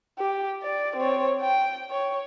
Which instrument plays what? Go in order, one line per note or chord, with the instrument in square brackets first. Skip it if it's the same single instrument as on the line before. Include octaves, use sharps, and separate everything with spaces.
[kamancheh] G4
D5
C4 C#5
G5
C#5